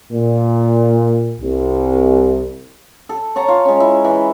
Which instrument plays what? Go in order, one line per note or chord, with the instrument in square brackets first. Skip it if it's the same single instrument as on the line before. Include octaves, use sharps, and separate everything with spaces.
[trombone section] A#2
C2
[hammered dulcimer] A4
C#5 A5 A#5
F4
G#3 C#4
E4
E3